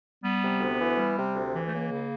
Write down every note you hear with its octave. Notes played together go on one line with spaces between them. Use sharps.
G3 B3
C3
D2
E3
G3
C3
D2
E3
A3
C#2 A#3
C#3